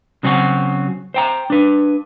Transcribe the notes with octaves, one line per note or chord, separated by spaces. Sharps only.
C#3 F#3 C4 C#4 F4 F#4
C5 G5 A#5
D4 B4